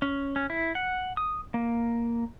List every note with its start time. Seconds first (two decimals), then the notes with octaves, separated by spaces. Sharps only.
0.02 C#4
0.36 C#4
0.50 E4
0.75 F#5
1.17 D#6
1.54 A#3